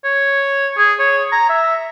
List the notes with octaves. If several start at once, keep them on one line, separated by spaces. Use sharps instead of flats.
C#5
G#4
C#5
A#5
E5